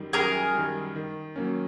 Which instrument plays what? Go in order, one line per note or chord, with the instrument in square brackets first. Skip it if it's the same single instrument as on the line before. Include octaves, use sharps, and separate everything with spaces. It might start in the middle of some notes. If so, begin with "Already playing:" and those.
Already playing: [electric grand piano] F#2 D#3 G3
[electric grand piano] F#2 [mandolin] G#4 A#4
[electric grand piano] D#3 G3
D#3
F#3 A#3 C#4